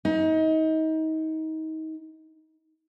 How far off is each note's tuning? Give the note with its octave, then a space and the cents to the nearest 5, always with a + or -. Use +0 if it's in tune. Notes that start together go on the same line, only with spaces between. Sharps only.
D#4 +30